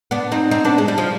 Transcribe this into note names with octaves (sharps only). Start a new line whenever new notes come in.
B3 D4
C4 D#4
C4 D#4
B3 D4
G#3
G3
F3